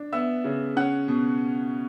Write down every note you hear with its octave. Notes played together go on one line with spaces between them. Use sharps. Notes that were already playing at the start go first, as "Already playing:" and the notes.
Already playing: D4
B3 E5 E6
C#3
C#4 F#5 F#6
B2